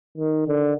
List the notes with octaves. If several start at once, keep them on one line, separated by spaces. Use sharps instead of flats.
D#3
D3